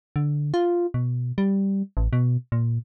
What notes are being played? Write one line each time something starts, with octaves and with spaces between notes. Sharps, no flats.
D3
F4
B2
G3
A1
B2
A#2